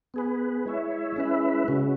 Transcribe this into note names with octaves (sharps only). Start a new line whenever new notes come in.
B3 G#4 B4
G#3 E4 C#5 E5
G#3 C#4 E4 B4 E5
C#3 G#3 C#4 F#4